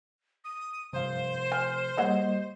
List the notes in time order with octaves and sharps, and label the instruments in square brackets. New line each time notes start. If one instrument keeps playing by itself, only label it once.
[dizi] D#6
[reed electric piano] G2 F5 [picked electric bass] C3 F3 [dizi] C5
[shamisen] G#5 [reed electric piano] F6
[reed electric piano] G3 A#3 D#5 [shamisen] G#4 C#5 F#5